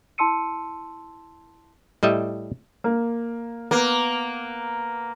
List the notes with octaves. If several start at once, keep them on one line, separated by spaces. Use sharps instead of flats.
E4 A5 C6 E6 C#7 D#7
A2 G3 D#5 E5
A#3
A#3 B3